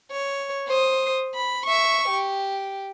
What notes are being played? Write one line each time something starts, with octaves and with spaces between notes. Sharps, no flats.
C#5
C5 D#6
B5
E5 C#6
G4